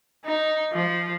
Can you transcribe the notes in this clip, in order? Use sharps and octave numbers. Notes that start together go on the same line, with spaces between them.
D#4
F3